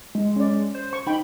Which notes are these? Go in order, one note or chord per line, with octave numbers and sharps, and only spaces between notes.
G#3
C#4 D5
C5
C#6
D#4 G5 B5